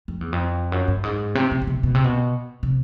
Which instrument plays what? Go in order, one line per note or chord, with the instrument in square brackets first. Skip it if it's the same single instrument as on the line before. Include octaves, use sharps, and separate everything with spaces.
[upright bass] F2
E2
F2
F#2
G2
G#2
C3
C3
C3
B2
B2
C3
B2
C3